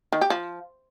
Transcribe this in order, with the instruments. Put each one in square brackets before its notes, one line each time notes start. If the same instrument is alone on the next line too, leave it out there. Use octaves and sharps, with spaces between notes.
[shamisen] D#3
G4
F3